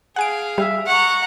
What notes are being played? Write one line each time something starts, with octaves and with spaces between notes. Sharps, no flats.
G#4 F5 F#5 G#5 D7
G3 E5
F#5 A#5 C#6